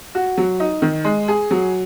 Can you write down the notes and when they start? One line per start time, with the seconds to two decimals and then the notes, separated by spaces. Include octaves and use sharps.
0.15 F#4
0.38 F#3
0.60 D#4
0.82 D#3
1.04 G#3
1.28 G#4
1.51 F#3